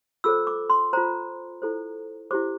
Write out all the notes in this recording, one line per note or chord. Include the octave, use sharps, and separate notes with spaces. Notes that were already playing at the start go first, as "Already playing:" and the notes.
F4 A4 C5 E6
D6
C6
F4 C5 A#5
E4 A4 C5
E4 G4 C5 D6